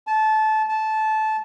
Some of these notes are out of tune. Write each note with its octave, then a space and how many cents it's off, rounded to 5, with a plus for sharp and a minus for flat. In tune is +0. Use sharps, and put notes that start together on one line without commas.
A5 -20
A5 -15